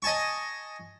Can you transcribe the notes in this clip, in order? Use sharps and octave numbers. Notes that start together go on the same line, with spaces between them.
D#5 G#5 A5 C#6